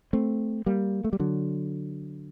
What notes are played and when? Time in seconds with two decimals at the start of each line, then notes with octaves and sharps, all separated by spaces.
0.13 A3 C4
0.66 G3 A#3
1.04 A3
1.13 G3
1.20 D3 F#3